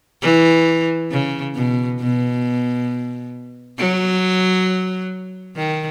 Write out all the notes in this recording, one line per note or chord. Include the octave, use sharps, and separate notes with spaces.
E3
C#3
B2
B2
F#3
D#3